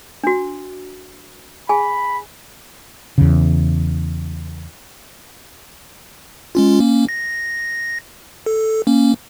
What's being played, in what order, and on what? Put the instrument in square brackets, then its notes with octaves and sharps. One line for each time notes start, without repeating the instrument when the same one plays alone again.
[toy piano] D4 F#4
[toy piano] G#4 G#5 [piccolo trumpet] B5
[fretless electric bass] E2 C#3
[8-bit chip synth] G#3 C#4 F4
A#3 C#4
A#6
A4
A#3 C#4